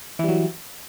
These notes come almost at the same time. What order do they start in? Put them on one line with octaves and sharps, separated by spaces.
E3 G3 F#3